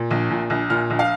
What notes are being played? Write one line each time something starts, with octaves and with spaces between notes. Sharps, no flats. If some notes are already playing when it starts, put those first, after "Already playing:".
Already playing: A#2
A#1
A#2
A#1
A#2 F6
A#1
F5